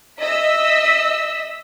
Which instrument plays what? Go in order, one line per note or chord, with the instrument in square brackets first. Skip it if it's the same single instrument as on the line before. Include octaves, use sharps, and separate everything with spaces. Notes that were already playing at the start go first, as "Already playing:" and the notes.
[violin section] D#5 E5 E6 B6